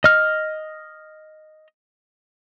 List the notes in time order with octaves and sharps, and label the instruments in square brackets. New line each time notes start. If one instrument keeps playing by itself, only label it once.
[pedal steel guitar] D#5 F6